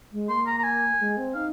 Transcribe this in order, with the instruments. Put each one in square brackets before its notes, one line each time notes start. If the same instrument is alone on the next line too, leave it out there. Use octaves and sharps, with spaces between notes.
[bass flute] G#3
[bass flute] A#3 [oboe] C6
[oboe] A#5
A#5
G#5
[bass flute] G#3
C4
[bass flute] D#4 [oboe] F5